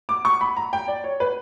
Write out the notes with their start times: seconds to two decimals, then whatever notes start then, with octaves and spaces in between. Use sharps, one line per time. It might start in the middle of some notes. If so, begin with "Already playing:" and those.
0.09 D6
0.25 C#6
0.41 B5
0.57 A#5
0.73 G5
0.88 D5
1.04 C#5
1.20 B4